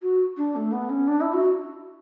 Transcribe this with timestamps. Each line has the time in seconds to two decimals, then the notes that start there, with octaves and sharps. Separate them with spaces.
0.02 F#4
0.37 D4
0.55 A3
0.72 B3
0.89 C#4
1.07 D4
1.21 E4
1.33 F#4